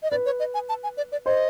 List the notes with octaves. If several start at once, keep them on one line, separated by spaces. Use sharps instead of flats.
D#5
B4 D5
C#5
D#5
G#5
A5
G#5
D5
D5
C5 D#5